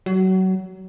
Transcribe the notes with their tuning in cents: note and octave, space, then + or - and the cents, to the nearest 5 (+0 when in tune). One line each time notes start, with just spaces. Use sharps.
F#3 +25